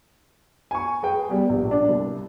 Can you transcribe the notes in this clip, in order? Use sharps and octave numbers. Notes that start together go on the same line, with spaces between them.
G#5 C#6
G#4 B4 G5
G3 B3 G4
A#1
D4
C2